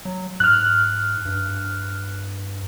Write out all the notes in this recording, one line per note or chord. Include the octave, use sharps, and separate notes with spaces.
F#3
G#2 F6 F#6
G2